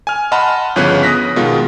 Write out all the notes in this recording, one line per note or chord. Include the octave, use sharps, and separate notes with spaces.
G#5 F6
D#5 F#5 A5 B5 C6 F6
G1 C#3 F3 B3 C#4 F#6
D#6 F#6 A#6 B6
B2 D#3 G#3 F4